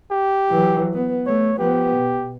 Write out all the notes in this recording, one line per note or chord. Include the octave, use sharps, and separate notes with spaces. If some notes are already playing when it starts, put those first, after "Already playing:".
G4
E3 F#3
B3
A3 C#5
F3 B3 G4
B2